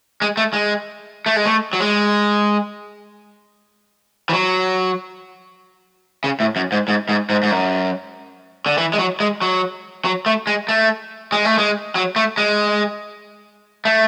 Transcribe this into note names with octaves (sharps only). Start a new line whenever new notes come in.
G#3
A3
G#3
A3
G#3
A3
F#3
G#3
E3
F#3
C#3
A2
F#2
G#2
G#2
G#2
G#2
G#2
F#2
D3
E3
G#3
F#3
G#3
F#3
F#3
A3
G#3
A3
G#3
A3
G#3
F#3
A3
G#3
A3